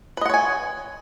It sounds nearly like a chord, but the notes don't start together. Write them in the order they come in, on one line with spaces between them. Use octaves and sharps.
B4 D#5 F#5 C#5 G#5